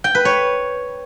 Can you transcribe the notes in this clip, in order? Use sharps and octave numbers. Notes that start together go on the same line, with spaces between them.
G5
B4
C#5